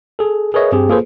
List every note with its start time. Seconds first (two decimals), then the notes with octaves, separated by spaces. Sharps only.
0.19 G#4 A4
0.54 G#4 A#4 B4 C#5 D#5 E5
0.72 G2 C4 G4 G#4
0.89 A#3 F4 G#4 A4 B4 C5